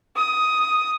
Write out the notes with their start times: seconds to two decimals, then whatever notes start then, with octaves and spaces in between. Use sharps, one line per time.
0.16 D#6